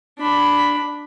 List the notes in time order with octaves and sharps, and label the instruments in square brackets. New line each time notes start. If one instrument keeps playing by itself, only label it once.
[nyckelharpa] D4 B5